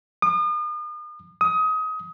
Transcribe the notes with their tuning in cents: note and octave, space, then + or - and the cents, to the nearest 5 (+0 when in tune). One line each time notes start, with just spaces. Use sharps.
D#6 -40
D#6 +25